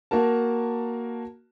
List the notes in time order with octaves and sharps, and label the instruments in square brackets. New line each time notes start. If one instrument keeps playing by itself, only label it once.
[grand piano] A#3 F#4 A#4 A5